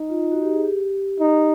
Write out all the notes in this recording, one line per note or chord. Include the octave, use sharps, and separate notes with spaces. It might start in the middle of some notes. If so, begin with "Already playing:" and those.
Already playing: D#4
F4
F#4
G4
G#4
G4
D#4